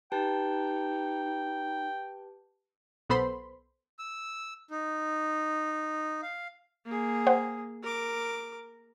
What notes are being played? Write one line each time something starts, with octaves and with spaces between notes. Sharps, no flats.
D#4 G4 B4 G5 A5
B1 B3 A4 C5 B5 C6
E6
D#4
F5
A#3 G#4
C5 F#5 G5
A#4 D6